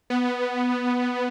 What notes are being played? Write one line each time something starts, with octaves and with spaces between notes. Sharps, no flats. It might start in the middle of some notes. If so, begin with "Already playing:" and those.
B3